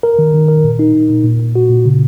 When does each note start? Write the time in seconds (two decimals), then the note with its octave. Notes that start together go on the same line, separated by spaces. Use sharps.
0.03 A#4
0.19 D#3
0.34 D#3
0.48 A#4
0.64 A#2
0.79 D#4
0.94 A#2
1.10 A#2
1.24 A#2
1.39 A#2
1.55 F#4
1.70 A#2
1.85 C#3